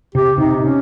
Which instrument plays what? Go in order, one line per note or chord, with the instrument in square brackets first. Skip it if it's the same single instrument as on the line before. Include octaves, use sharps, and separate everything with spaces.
[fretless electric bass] C3 [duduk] G4
[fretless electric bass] C3 [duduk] D#4
[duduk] C#4